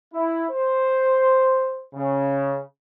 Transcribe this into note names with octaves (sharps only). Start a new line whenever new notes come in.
E4
C5
C#3